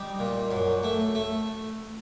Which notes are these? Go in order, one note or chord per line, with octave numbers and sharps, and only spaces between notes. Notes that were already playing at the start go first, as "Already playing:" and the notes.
Already playing: G3 D#4
A#2
F#2
A3
A3